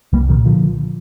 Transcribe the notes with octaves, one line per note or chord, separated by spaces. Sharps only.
C2 G3 A#3
A#2 D#3 G3
D3 F3